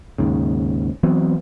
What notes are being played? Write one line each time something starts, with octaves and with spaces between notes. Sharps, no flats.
D#2 G#2 C#3
E3 F#3 B3 C4